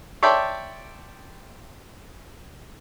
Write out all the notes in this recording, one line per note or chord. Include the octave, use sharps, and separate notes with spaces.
C#5 D5 E5 G5 A5 C6